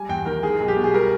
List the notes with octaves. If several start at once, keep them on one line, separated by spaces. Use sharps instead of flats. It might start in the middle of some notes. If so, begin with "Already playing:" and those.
Already playing: G3 G#5
E2 G5
D#3 A#4
G#3 G#4
B1
G4
B2
G#4
G3 A#4